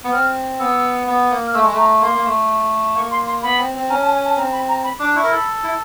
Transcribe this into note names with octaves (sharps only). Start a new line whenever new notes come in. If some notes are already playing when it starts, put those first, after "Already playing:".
B3
C4 F6
B3 E6
B3
A#3
F6
A3 E6
G#3
A3
A#5
A#3 C6
A#3
A3
A#3 C#6
C6
C6
B3 B5
C4
C4
C#4 A#5
A5
G#5
A5
C4 A#5
B5
A#5
B5
D4 D6
E4 C#6
A#4
A4 B5
E4